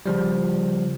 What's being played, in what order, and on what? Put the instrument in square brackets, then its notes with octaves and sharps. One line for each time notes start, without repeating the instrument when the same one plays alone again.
[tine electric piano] C#3 F3 G3